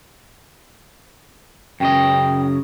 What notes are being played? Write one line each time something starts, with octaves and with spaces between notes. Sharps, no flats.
F#2 C#3 D#5 G5